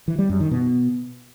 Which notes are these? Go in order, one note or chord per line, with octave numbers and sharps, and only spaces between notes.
E3
G3
F#2
D#3
B2